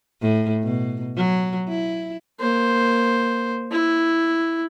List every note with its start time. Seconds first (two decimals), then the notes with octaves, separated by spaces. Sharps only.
0.22 A2
0.63 B2
1.16 F#3
1.68 E4
2.40 A#3 C5
3.72 E4